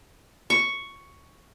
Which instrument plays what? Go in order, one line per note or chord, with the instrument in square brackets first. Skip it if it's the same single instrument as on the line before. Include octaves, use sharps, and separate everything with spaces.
[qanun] C#6